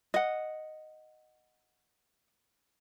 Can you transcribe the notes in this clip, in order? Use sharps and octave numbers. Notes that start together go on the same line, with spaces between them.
D#5 F#5